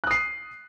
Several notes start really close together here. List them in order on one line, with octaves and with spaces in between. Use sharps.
F#6 D#6 C7